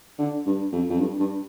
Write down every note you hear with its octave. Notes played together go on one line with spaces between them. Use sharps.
D3
G2
F2
F2
G2
G2